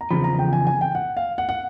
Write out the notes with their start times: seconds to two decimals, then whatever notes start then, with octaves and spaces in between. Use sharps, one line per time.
0.01 A#5
0.11 E2 C#3 F3 B5
0.24 A#5
0.39 G5
0.53 G#5
0.67 G#5
0.81 G5
0.95 F#5
1.17 F5
1.38 F#5
1.49 F#5